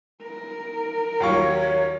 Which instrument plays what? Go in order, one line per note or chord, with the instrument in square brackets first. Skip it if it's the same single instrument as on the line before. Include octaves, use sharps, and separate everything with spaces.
[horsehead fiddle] A#4
[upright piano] D#2 F4 C#6 [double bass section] D#3 F#3 [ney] C#5